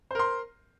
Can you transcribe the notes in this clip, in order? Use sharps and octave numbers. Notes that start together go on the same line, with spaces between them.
A#4 C5 C6